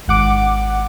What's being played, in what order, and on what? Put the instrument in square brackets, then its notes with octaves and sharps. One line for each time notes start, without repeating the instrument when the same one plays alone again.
[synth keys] G#1 F#5 D6